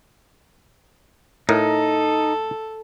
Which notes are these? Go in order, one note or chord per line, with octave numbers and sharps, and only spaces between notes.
A2 D#4 A4 A#4